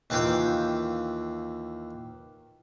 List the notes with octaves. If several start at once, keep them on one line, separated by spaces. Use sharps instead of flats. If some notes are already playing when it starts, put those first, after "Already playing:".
D#2 E3 F4 F5 G5